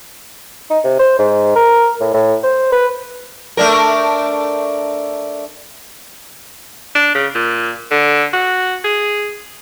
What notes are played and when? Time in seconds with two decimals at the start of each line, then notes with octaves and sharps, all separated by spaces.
0.70 D#4
0.84 C3
0.99 C5
1.19 G#2
1.56 A#4
2.00 A2
2.14 A2
2.43 C5
2.72 B4
3.57 A3 D4 A#4
6.95 D4
7.15 C#3
7.35 A#2
7.91 D3
8.33 F#4
8.84 G#4